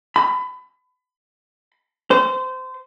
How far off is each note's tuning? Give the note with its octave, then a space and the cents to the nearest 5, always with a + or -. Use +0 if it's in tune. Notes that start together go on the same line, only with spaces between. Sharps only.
B5 +30
C5 -25